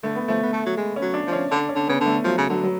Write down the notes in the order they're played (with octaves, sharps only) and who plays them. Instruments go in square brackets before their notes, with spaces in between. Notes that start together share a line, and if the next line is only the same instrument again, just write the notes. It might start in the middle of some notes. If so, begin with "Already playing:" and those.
[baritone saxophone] D3 [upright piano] A3
[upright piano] B3
[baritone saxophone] F3 [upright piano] A3
[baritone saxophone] B3
A3
F#3
G#3
[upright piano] C#4
[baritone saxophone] F#3
[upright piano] D4
[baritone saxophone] F3
[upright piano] C#4
[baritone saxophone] D3 [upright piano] D4
[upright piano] C#4
[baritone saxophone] D3
[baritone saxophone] C#3 [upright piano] B3
[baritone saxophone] D3
[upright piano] A3
[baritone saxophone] F3 [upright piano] F#3
[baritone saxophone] C#3
[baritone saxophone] D3 [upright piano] F#3
[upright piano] F#3